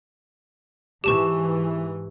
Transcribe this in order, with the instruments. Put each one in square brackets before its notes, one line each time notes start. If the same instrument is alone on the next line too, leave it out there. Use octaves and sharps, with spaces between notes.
[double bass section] G#2 E3 [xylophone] G4 A5 C#6